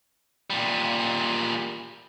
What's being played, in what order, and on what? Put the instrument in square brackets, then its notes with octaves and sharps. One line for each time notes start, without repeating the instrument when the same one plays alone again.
[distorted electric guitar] A#2 G3